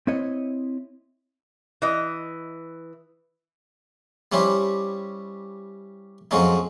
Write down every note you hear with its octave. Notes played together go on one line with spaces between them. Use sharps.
C4 E4 C#5 D#5
E3 D#5
G3 C#4 E4 G4 C5
F2 F3 F#3 G#3 C#4 D#4